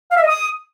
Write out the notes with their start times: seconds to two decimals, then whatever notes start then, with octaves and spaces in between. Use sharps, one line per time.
0.12 F5
0.17 E5
0.22 D#5
0.27 D#6